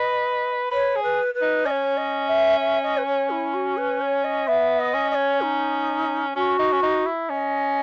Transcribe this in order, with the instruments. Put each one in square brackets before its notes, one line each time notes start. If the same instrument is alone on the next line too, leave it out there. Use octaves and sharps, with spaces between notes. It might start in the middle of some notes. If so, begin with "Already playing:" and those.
Already playing: [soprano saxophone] B4 [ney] D#5
[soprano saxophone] B4 [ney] C#5
[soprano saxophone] G#4
[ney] B4
B4
[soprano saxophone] D#4
[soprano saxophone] C#4 [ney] D#5
[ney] C#5
D#5
E5
E5
D#5
B4
C#5
E4
F#4
B4
C#5
D#5
[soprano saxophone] B3 [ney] E5
[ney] D#5
[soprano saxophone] C#4
[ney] D#5
C#5
D#4
[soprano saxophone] C#4 [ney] F#4
[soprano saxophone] D#4
C#4
D#4
E4
[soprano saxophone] C#4 [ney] D#5